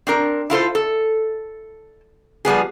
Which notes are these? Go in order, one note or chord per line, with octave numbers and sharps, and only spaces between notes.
C4 D4 A#4
E4 F4 A4 C5
A4
F3 G3 B3 G#4